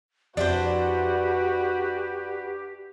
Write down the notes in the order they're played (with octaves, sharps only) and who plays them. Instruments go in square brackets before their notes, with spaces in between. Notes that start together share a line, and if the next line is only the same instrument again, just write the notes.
[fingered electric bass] F2 [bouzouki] D4 E4 C5 [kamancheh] F#4 B4 [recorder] G4